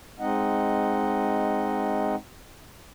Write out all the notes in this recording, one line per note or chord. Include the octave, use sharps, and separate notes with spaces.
G#3 C4 D#4 D#5 F#5